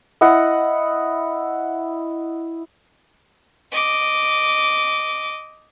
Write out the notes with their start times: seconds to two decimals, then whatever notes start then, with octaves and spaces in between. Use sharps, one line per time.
0.21 E4 D#5 F#5
3.72 D#5 D6